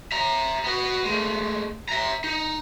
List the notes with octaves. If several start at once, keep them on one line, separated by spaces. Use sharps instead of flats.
E5 A#5
B3 F#4
G#3 A3
E5 A#5
D#4